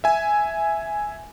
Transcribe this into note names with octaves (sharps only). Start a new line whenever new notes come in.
E5 G#5